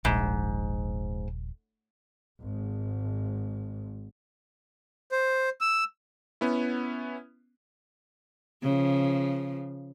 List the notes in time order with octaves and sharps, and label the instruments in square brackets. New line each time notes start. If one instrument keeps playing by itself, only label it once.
[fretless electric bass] D#1 A#1 [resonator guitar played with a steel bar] G#2
[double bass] G#1 G#2
[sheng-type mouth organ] C5
E6
[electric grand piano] B3 C#4 E4
[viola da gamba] C#3 F3